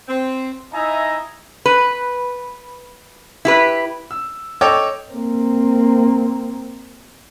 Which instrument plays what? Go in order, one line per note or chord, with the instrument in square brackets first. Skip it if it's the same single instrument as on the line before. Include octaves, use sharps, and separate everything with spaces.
[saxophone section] C4
[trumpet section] D#4 E4 D#5 E5 G#5 A#5
[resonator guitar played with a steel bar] B4
E4 G4 B4
[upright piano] E6
A4 C#5 D#5 G5 D6 E6
[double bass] A#3 C4